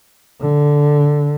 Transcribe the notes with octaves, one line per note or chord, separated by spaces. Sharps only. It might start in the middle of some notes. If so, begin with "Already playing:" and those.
D3